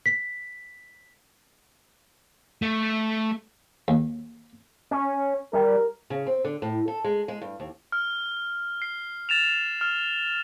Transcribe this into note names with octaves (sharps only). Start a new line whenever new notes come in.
B6
A3
D#2
C#4
G3 A#4
C#3
C4
D3
A2
A4
G#3
G#3
G2
D#2
F6
C7
A6 E7 F7
F6